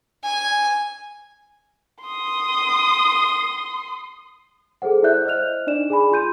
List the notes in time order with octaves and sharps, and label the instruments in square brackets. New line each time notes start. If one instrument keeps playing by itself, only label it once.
[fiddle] G#5
[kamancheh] C6 D#6
[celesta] G#4 A4 C5 F#5
E4 C5 D5 E5 F#6 G6
C5 D#5 F6 F#6 F7
D4 D#4 D5 E7
G#4 G#5 B5
F4 C6 G6 D#7